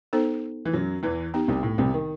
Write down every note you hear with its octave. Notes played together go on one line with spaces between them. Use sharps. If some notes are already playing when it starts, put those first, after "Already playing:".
B3 D#4 A4 C5
E3
F#2 F#3
E2 E3
B3 D#4 G4
C2 C3
A2
C2 C3
D#3